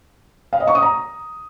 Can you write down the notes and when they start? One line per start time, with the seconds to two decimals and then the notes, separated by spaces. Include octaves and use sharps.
0.53 F5
0.60 D#5
0.67 C#6
0.75 D#6
0.82 A#5